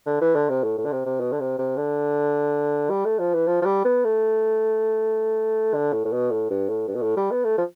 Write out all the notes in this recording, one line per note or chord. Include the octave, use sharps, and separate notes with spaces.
D3
E3
D3
C3
A2
A2
D3
C3
C3
B2
D3
C3
C3
D3
G3
A3
F3
E3
F3
F3
G3
B3
A3
D3
A2
A2
B2
A2
G2
A2
G2
B2
A2
G3
B3
A3
F3